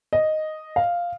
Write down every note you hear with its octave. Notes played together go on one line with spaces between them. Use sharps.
D#5
F5